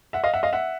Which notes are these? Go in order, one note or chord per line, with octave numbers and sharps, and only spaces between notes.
E5 F#5
D#5 F5
E5 F#5
D#5 F5
E5 F#5